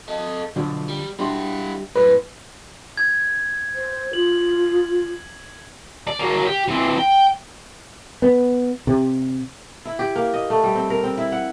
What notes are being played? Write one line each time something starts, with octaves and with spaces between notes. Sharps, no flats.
A4 D#5
B1 D3 F3 D4
G3
G3 D4 E4 F#4 C6
F#2 A2 B4
G#6
C5
F4 F#7
D5
F#3 A#3
G4
E3 C4
G5
B3
C3
E4
G4
A#3
D#5
A3
G3
C4
A#4
C4
E4
F#5